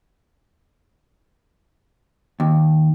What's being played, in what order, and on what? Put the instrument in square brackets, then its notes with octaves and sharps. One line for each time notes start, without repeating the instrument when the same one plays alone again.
[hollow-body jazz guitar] D#2